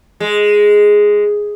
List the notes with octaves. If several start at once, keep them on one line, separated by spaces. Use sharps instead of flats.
G#3